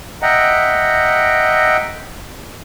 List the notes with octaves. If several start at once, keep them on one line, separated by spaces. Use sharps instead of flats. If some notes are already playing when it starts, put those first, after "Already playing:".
D#5 E5 F#5 G5 A#5